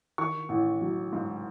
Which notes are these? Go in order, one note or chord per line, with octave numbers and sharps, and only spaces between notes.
D#3 C#6
A1
F#3
G#2